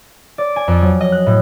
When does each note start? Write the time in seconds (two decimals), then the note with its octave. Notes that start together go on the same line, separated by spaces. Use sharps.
0.38 D5
0.56 G#5
0.68 F2
0.82 F#3
1.01 D#5
1.12 F#6
1.26 A2